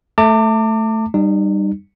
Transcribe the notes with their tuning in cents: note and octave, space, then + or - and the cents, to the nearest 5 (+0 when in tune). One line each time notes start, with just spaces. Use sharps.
A3 +0 A5 +45 D6 +10
G3 +0 D#4 -35